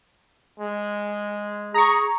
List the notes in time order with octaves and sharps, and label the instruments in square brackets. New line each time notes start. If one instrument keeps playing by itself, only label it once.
[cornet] G#3
[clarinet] G#4 [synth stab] A#5 C#6